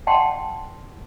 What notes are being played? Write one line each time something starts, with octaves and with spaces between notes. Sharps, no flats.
D5 F#5 G5 A5 C6